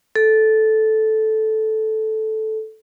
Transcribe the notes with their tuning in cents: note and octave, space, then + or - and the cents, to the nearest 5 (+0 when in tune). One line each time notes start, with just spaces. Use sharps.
A4 -10